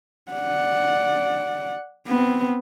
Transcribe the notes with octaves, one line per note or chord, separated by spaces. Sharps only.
D5 F#5
B3 C4